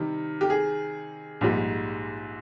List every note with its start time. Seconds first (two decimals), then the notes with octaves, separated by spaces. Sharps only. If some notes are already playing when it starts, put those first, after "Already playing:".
Already playing: C3 D#3 G3
0.41 G4
0.50 G#4
1.41 A#1 G#2 G3